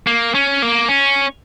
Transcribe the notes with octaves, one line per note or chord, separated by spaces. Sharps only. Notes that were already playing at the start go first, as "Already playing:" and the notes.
A#3
C#4
A#3
C#4